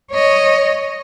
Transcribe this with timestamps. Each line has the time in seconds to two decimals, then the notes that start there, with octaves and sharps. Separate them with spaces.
0.12 C#5 D#5